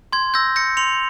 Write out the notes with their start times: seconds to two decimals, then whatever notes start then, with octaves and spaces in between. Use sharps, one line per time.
0.13 C6 G#6
0.34 E6 G6 A#6
0.56 G6 A#6 C#7
0.77 C6 C#7 F7